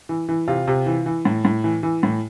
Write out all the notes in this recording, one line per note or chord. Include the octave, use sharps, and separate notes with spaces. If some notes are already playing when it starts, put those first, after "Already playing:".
E3
E3
C3 F4
C3
E3
E3
A2
A2
E3
E3
A2